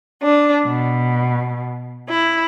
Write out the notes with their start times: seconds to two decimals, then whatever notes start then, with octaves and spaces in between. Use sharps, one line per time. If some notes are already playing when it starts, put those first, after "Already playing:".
0.23 D4
0.67 B2
2.08 E4